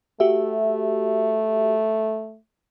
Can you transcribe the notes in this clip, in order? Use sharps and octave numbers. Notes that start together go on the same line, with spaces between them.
A3 F#4 G4 E5